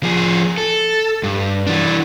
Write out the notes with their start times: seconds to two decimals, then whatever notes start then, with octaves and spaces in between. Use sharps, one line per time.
0.03 F3 G#4
0.58 A4
1.23 G2
1.67 E3 D4